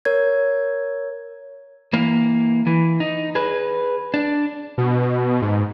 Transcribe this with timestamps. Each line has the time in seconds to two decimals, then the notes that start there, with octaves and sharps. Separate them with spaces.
0.05 A#4 C#5 G#6
1.93 E3 A#3
2.67 E3
3.00 D#4
3.35 G#4 B4
4.14 D4
4.78 B2
5.42 G#2